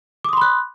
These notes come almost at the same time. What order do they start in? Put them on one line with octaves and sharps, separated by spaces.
D6 D#6 C6 B5 F#6